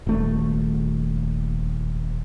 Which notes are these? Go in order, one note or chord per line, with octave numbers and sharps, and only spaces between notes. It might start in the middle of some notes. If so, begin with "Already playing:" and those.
D#1 A3